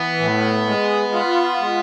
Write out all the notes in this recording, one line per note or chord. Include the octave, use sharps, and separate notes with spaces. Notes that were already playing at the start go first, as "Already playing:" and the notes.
Already playing: E3 B3
A2
G#3
F4
G#3